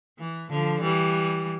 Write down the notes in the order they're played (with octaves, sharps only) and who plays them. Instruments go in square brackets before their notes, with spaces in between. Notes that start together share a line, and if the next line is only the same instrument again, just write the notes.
[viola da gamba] E3
D3 F3
E3 G3